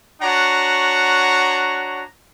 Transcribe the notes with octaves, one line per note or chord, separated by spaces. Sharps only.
D4 F#4 C#5 F#5 A#5